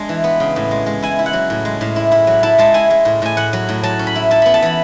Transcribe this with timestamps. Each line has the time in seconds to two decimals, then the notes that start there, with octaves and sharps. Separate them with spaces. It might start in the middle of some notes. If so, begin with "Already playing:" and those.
Already playing: G#3 D4
0.09 E3
0.24 B3
0.40 C#3
0.56 A2
0.71 G#3
0.86 G#3
1.02 E4 G#5
1.19 E4
1.26 F#5
1.33 F#3
1.50 A2
1.65 G#3
1.81 A2
1.96 E4
2.12 E4
2.27 F#3
2.43 E4 A5
2.58 G#3 A5
2.74 E4 G#5
2.90 G#3
3.05 A2
3.22 A2 G#5
3.37 A2 F#5
3.53 F#3
3.69 A2
3.83 F#3 A5
3.99 C#4
4.07 B5
4.15 E4
4.31 E4 A5
4.42 B3 B5
4.54 A5
4.62 E3 B5